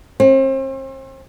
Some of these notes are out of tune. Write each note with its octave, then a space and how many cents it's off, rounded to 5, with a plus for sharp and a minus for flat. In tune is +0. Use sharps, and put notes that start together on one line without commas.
C4 +40